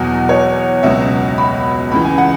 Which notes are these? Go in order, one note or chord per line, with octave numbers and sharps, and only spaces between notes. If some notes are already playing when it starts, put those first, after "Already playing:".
Already playing: E2 B2 F#3
C#5
C#2 B2 F#3 E5
B5
C#2 C#3 E3 B5
G#5
F#5